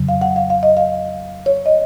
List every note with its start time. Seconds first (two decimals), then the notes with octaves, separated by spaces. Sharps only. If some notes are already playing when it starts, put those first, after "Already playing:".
Already playing: F2 C#3 F#3
0.09 F5
0.21 F#5
0.36 F5
0.50 F5
0.63 D#5
0.77 F5
1.46 C#5
1.66 D#5